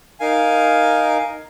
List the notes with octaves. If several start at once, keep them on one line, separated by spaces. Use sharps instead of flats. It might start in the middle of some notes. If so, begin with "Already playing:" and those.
D#4 A#4 F5 G#5